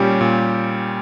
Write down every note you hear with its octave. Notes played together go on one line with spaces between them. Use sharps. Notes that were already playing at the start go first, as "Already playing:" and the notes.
Already playing: A#2 G3 C#4 G4
A#2